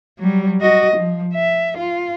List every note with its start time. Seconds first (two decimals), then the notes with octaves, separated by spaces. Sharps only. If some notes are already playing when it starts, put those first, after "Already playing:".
0.19 F#3 G3
0.61 F#4 D#5
0.97 F3
1.34 E5
1.78 F4